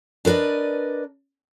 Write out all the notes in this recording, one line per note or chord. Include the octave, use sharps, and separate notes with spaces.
D4 A#4 B4 D5 D#5